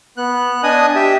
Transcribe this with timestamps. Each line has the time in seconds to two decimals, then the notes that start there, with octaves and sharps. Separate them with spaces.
0.17 B3 F#6
0.64 D4 D#5 G#5 D#6
0.96 G4 E5